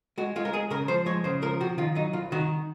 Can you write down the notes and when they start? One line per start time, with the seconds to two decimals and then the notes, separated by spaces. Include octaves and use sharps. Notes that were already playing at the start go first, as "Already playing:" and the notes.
0.18 G#3 F#4
0.36 G#3 F4
0.45 A#4
0.53 G#3 G#4
0.71 C#3 A#4
0.88 F3 C5
1.06 G#3 C#5
1.24 C#3 C5
1.42 F3 A#4
1.60 C3 F#4
1.78 D#3 F4
1.95 F#3 D#4
2.13 C2 F4
2.32 D#3 F#4